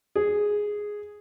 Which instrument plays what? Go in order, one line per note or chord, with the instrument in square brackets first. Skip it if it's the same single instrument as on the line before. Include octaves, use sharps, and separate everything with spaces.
[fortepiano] G#4